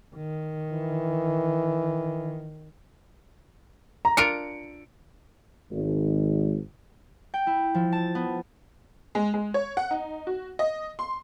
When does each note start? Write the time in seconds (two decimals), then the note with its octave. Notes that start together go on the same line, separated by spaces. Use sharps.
0.15 D#3
0.72 E3
4.05 A#5
4.17 D4 F4 A#4 C#7 D7
5.71 G#1
7.34 G5
7.47 E4
7.75 F3
7.92 A5
8.15 B3
9.15 G#3
9.34 G#3
9.54 C#5
9.77 F#5
9.91 D#4
10.27 F#4
10.59 D#5
10.99 C6